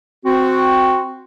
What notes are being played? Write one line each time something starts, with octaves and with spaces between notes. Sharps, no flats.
C4 F#4